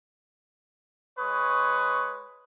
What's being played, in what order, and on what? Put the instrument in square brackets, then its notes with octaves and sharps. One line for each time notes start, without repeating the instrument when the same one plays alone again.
[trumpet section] G#3 B4 C#5 C#6 D#6